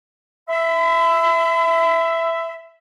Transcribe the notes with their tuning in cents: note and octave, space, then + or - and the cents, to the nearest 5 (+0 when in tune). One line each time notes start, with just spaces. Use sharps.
E5 +5 B5 +45